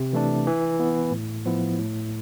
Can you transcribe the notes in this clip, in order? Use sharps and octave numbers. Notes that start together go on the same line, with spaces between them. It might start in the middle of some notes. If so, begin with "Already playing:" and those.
Already playing: C3
E3 A3 D4
E3
B3 E4
A2
F3 B3 E4
A2